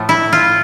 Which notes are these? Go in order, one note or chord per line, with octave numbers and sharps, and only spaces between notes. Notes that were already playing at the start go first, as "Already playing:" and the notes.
Already playing: A2 F3 A3
E4
F4